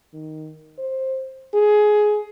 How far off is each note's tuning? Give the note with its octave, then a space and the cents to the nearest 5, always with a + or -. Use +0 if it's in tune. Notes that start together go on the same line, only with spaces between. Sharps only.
D#3 +0
C5 +10
G#4 +15